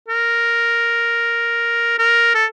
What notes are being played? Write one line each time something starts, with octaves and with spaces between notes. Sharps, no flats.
A#4
A#4
A4